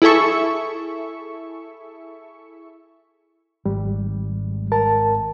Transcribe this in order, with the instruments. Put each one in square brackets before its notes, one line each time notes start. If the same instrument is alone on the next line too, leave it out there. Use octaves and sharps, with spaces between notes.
[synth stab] E4 G#4 A4 E5 C#6
[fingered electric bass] G#1 [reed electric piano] G3
[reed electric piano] A#4 A5